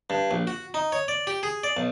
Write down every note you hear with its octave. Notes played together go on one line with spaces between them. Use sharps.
G2
A#1
F#4
D#4
C#5
D5
G4
G#4
D5
B1